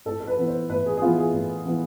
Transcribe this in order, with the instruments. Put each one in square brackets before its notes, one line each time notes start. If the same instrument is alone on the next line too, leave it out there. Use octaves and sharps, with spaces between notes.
[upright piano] A2 A4
A4
B4
E3 B3
C5
A2 B4
G#4
G#4
E3 B3 F4
G#4
A2
E3 B3